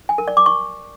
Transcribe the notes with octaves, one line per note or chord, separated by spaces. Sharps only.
G#5
A#4
D5
D6
C#6